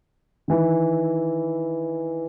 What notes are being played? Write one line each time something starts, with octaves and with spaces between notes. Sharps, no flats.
D#3 E3